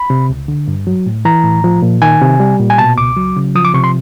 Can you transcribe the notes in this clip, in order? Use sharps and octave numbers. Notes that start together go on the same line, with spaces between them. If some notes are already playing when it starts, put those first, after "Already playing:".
Already playing: B5
C3
C#2
D3
G2
F#3
A2
E3 A#5
A2
F3
A#2
D#3 G#5
C3
G3
A#2
G#5
B2 A5
C#2 D6
F#3
C#3
F3 D#6
D6
C3 C#6
C6